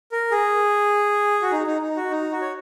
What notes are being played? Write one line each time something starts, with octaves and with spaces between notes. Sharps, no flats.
A#4
G#4
F#4
D#4
D#4
D#4
F#4
D#4
F#4
C#5